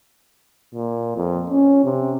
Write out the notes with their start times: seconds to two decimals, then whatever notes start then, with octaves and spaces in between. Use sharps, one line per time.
0.75 A#2
1.17 F2
1.50 C#4
1.84 C3